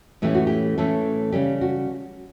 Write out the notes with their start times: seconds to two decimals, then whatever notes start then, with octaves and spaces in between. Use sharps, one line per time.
0.22 A2 E3 A3 C#4 G4
0.35 F#4
0.47 G4
0.78 A2 E3 A3 C#4 A4
1.32 C#3 G3 C#4 G4
1.61 F#4